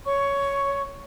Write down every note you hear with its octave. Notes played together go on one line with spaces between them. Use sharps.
C#5 C#6